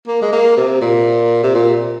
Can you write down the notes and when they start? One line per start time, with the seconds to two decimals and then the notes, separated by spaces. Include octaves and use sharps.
0.08 A#3
0.22 G#3
0.33 A#3
0.57 C3
0.81 A#2
1.43 C3
1.55 A#2